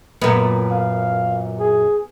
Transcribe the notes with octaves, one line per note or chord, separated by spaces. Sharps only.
F#2 A#2 B3 A4 A#4
F5
G#4